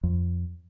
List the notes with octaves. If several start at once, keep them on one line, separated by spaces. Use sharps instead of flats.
F2